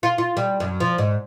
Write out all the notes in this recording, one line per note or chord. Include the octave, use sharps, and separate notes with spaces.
F4
F4
G3
F#2
F3
G#2